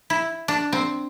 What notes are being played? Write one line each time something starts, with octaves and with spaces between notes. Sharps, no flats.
E4
D4
C4